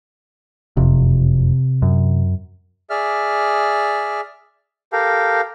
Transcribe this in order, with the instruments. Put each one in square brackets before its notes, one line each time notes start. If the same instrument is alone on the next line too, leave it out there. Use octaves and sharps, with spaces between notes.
[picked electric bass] F#1 F2 [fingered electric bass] C3
[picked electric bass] F#2
[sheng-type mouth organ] G#4 D5 E5 F6
G4 A4 A#4 F5